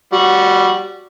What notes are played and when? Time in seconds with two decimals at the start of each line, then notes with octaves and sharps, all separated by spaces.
0.13 G3 F#4